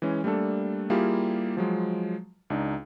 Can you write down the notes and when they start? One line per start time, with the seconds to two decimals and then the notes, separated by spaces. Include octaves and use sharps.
0.02 E3 G#3 C#4
0.24 G3 A3 A#3 D4 A4
0.90 G3 A#3 E4 F4 G4 G#4
1.57 F3 F#3 G#3
2.50 C#2 D4 D#4